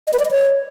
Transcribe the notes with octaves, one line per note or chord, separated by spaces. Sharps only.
D#5
B4
D5
D#5
C#5